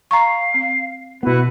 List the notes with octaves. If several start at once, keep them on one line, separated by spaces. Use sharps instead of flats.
F5 A#5 C#6
C4
B2 B3 E4 F#4 B4